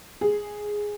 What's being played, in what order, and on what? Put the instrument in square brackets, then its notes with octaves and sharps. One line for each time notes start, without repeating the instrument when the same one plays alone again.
[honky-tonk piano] G#4